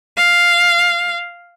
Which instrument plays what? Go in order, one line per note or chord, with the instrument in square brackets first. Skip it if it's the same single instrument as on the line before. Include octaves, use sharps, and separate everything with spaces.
[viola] F5